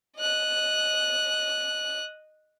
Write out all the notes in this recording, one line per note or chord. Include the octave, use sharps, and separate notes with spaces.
D#5 F#6